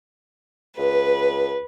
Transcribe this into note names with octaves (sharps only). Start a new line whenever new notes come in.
C#2 B4